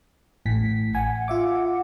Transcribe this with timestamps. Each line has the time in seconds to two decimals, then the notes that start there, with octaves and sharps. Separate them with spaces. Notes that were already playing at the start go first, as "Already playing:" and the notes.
0.46 A1 A2 B6
0.95 F#5 G#5
1.28 F4 E5 D6